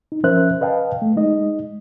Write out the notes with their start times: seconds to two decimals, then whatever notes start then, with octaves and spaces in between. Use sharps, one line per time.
0.12 D#4
0.24 F3 C#4 A#4 C5 E5 F#6
0.61 B4 D#5 F5 G5 A5
1.02 A3
1.16 G#3 D#4 D#5